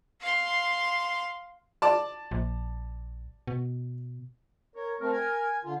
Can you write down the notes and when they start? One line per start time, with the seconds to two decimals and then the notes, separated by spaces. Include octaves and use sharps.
0.21 F5 C6
1.82 D5 A5
2.31 A#1
3.47 B2
4.76 A#4 C#5
5.01 A3 C4 A#4
5.12 G#5
5.64 D3 F4